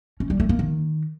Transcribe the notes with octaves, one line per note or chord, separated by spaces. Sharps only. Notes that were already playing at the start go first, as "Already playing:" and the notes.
C#4
G3
A3
A#3
D#3